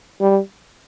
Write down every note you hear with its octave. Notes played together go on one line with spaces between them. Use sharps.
G3